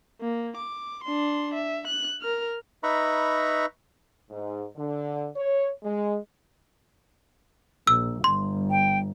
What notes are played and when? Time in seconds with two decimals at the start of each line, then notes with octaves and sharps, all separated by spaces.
0.21 A#3
0.57 D6
1.04 D4 C6
1.55 E5
1.87 F#6
2.22 A#4 F6
2.83 D#4 B4 E5 A#5 B5 C#6
4.31 G#2
4.76 D3
5.36 C#5
5.84 G#3
7.87 A#1 E6
8.24 G1 C6
8.70 G5